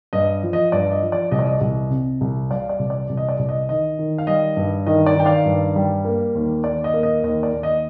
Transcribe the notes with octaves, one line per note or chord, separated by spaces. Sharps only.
G2 D#5
F3
D#5
G2 D5
D#5
F3
D5
C2 D#5
D5
D#5
C2
C3
C2
G3 D5 F5
D5
C2
D5
C2
D#5
D5
C2
D#5
D#3 D#5
D#3
F5
G3 D#5
G2
D#3 D#5
D5
D#3 G5
D5 F5
G2
G3
A#3
D#2
D#2 D5
D#5
A#3
D#5
D#2 D#5
D5
D#2
D#5